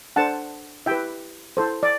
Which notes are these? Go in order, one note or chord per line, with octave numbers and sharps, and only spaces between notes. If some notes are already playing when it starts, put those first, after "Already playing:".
D4 A4 C5 F#5 A5
E4 G4 B4 E5 G5
E4 A4 C5
D5